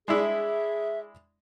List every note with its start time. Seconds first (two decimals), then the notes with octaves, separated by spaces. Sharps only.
0.08 G#3 D4 E4 G#4 E5